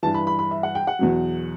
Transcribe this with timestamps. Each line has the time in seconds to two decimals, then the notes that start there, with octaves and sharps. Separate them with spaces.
0.03 G2 E3 A5
0.14 B5
0.27 B5
0.39 B5
0.51 E5
0.63 F#5
0.75 G5
0.87 F#5
0.99 E2 B2 F#3